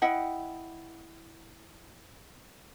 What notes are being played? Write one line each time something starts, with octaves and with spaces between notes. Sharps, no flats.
E4 D#5 F#5 G5